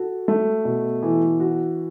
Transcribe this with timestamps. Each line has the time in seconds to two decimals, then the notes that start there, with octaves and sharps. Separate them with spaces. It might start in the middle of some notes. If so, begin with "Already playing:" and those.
Already playing: F#4 A4
0.28 A3
0.65 B2
1.03 E3
1.40 F#4